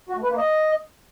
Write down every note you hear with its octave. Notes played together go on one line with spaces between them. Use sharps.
F#4
A3
B4
A#3
D#5